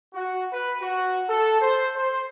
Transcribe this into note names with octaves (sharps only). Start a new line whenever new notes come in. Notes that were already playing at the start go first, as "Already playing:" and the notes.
F#4
B4
F#4
A4
C5
C5